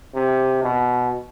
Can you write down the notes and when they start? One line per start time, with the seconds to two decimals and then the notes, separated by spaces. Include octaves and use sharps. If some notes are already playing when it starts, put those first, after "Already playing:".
0.14 C3
0.63 B2